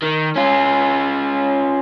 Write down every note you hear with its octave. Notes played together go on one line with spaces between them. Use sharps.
D#3
C#4 F4